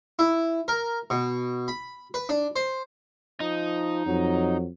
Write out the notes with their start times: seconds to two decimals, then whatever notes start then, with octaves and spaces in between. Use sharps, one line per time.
0.19 E4
0.68 A#4
1.10 B2
1.68 B5
2.14 B4
2.29 D4
2.56 C5
3.40 F3 D#4
4.06 F2 F#3